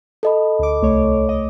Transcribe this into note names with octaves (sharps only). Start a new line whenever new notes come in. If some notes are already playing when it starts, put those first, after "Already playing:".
A4 D#5 B5
D2 D6
C2 A3 C#5
C2
D#5